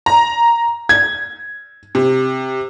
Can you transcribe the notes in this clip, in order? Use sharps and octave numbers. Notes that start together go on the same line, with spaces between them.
A#5
G#6
C3